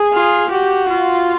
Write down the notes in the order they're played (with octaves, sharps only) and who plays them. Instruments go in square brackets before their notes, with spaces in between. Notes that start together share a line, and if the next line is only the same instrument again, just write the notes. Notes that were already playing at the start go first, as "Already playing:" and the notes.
Already playing: [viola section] G#4
[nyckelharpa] F4
[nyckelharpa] F#4 [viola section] G4
[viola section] F4